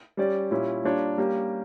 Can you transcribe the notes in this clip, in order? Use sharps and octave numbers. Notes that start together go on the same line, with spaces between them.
G3 C#4 G4 D5
A#2 G3 C#4 E4
G3 A#3 D4 F4 C#5
G3 A#3 C#4 G4